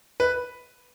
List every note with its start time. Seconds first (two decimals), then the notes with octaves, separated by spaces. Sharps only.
0.20 B4